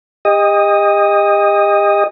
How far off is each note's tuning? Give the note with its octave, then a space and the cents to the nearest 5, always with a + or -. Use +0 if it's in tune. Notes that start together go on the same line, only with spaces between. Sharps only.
G4 +40 D#5 +0